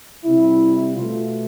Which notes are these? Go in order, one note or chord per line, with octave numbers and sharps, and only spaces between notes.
C3 G3 E4
B2 A3 F4